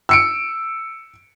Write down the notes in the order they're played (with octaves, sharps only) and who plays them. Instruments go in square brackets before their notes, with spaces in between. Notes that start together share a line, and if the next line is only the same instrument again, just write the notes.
[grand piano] E6 C#7 D7